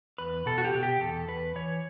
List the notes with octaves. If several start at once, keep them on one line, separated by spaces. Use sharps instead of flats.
E2 B4
B2 A4
F#4
G4
B2
G4
E2 A4
E2 B4
E3 C#5